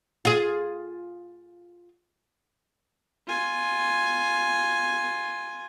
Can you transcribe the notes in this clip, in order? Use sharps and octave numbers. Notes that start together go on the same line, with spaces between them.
F4 G#4
F4 G#5